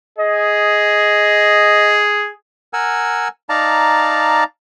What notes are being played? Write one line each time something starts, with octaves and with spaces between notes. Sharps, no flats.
G#4 D#5
A#4 F#5 G#5 E6
D#4 D5 F5 A5 A#5